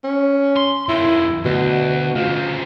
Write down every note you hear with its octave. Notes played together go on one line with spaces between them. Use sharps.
C#4
C6
F2 D#3 E4
D2 B2
C#3 C4 F4